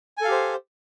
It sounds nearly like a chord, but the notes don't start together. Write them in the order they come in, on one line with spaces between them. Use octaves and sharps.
G#5 A4 F5 G4 C5